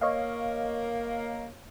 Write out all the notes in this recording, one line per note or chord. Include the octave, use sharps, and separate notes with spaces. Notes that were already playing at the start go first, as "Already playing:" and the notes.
A#3 C#5 D#5 F5